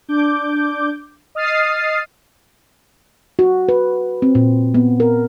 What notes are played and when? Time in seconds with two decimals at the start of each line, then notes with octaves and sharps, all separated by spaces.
0.09 D4 D6 G6
1.35 D#5 D#6 F6 A6 C7 D#7
3.39 F#4
3.69 B4
4.22 C4
4.35 A#2
4.74 B3
5.00 A#4